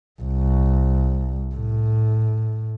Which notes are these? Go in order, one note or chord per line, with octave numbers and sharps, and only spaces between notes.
C2
A2